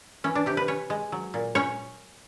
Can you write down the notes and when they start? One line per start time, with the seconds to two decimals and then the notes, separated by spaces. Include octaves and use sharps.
0.24 E3 C#4
0.35 D4
0.46 C3 G4
0.57 B4
0.68 C#4 C#5
0.90 G#3
1.12 F#3
1.34 A#2
1.55 C#4 C#5